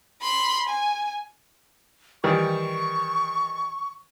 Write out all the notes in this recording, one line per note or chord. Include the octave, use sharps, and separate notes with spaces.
B5 C6
G#5
D#3 E3 G3 C#6